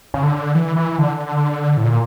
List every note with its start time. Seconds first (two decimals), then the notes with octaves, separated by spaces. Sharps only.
0.14 C#3
0.23 D3
0.55 E3
0.76 E3
0.98 D3
1.77 A2
1.84 A#2